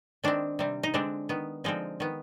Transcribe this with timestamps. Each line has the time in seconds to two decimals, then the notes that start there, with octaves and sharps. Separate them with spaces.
0.24 D#3 G#3 C4 D4
0.59 C3 G3 C4
0.83 D#4
0.94 D3 G#3 C4 D4
1.29 D#3 B3
1.64 D3 F3 G#3 C4 D#4
2.00 D#3 B3